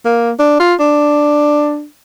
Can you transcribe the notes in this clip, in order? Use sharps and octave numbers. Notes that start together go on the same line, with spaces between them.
A#3
D4
F4
D4